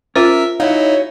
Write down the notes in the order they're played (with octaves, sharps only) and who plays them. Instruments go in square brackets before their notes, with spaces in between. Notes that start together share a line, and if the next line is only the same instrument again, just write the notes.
[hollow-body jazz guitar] C#4 [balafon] F4 C5 [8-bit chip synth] A#4 E5
[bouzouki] F#3 C#4 [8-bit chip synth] D#4 E4 [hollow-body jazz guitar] F5